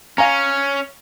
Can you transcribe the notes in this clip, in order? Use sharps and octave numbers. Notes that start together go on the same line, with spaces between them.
C#4 F5 G#5 A#5